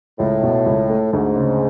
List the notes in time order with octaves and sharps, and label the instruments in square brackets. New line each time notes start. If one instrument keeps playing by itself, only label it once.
[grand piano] C#2 [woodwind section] A2
[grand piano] B2
C#2
A3
[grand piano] D2 [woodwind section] G#2
[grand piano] C#3